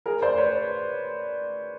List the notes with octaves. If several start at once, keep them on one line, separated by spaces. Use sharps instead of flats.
G#4 A#4
C5 D5
B4 C#5